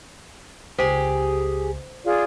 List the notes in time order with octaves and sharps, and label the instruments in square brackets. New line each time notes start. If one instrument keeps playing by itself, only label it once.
[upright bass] C#2 [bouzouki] G4 G#4 [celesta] C5
[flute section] F4 G#4 D5